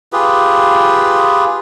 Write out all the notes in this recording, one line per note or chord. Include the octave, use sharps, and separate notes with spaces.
F4 G4 G#4 B4